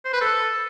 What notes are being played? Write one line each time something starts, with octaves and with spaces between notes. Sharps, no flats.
C5
B4
A4